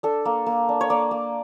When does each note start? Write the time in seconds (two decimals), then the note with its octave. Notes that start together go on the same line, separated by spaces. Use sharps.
0.03 D4 A4
0.25 A#3
0.46 A#3
0.69 D4
0.81 C#5
0.90 A#3 D5
1.11 A#3